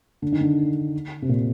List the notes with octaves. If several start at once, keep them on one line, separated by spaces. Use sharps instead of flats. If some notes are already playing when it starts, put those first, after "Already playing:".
D3
D#3
D3
C3
A#2